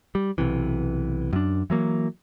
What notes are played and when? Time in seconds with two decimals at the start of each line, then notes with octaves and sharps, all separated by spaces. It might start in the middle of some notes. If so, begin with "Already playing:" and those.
0.15 G3
0.38 B1 C3 E3
1.33 F#2 D4
1.70 E3 F#3 A#3